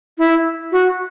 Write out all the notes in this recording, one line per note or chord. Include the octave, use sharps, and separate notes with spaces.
E4
F#4